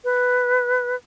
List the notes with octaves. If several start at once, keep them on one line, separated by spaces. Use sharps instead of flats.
B4